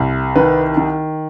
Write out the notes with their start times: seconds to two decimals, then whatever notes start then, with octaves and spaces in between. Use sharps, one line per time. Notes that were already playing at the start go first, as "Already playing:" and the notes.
Already playing: C2
0.36 D#3 B4
0.77 D#3